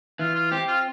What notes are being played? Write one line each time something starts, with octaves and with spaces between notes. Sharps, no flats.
E3 F4
F4
C4 G4
F4